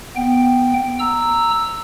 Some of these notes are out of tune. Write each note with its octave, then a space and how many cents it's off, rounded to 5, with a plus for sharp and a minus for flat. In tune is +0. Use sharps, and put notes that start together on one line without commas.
B3 +0 G5 +0
A#5 -10 E6 +0